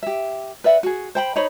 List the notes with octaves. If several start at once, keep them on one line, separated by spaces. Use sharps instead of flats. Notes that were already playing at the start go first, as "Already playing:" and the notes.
G4 E5
B4 D5 E5 F#5
F#4 G#4
C5 G5 B5
D#4 C5 C#5 B5